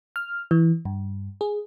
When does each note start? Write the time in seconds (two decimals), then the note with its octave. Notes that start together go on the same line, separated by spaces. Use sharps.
0.16 F6
0.51 E3
0.85 G2
1.41 G#4